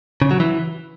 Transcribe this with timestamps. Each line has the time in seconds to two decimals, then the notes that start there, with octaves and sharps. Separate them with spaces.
0.22 C#3
0.31 F#3
0.40 E3